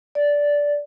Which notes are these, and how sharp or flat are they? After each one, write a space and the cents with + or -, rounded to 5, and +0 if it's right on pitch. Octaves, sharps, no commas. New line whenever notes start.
D5 -10